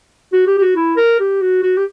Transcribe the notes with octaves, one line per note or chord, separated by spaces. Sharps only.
F#4
G4
G4
F#4
E4
A#4
G4
F#4
F#4
G4